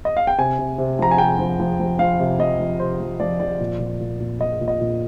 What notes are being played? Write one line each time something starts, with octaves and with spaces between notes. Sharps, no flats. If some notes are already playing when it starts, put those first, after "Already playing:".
D#5
F5
G5
C3 G#5
C3
C3
F3 A#5
G#5
C3 G5
F3
F3
F3
F3 F5
C3
F3 D#5
F3
C3 C5
F3
F3 D5
F3 D5
A#2
A#2
A#2
A#2
A#2 D#5
A#2
D#5
A#2